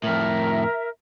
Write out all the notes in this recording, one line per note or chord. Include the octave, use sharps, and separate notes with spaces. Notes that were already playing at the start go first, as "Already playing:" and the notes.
F2 A2 A#4 E5